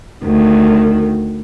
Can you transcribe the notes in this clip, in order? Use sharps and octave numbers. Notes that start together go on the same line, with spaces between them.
D2 D#3